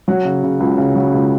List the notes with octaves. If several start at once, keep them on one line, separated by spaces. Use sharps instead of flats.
F#3 F#5
C#3
C#3
C#2
C#3
F#3
C#2